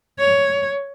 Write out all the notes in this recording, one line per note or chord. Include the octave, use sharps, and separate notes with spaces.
C#5